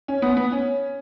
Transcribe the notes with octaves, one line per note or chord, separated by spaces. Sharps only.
C#4
B3
B3
C#4